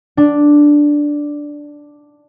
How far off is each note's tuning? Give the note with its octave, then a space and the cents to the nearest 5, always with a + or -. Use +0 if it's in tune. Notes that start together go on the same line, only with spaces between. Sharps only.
D4 +0